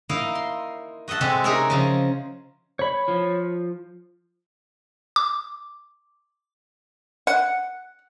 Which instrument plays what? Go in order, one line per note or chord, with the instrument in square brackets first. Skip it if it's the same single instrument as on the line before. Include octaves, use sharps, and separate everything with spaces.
[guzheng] A#3 D#4 E4 A#4 D#5 F5
C6
F#4 D#5 E5 F#5 A5
C3 G#3 C4 F#4 G4 A4
C#4 D#4 G#4 A#4 C#5 E5
C#3 F3 A#5
[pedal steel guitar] C#5 B5
[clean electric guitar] F3
[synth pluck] D6
[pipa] F#5